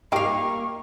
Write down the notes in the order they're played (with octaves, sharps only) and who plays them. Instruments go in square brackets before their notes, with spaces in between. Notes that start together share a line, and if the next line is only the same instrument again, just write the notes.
[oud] A#3 F5 [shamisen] D#4 F4 G4 [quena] C#6